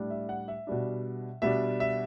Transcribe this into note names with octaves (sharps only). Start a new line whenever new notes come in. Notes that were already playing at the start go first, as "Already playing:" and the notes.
Already playing: A2 G3 D4
E5
F#5
E5
B2 G3 D4
B2 G3 D4 E5
E5